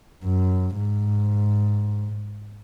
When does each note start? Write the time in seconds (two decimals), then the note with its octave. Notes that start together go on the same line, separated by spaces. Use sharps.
0.24 F#2
0.77 G#2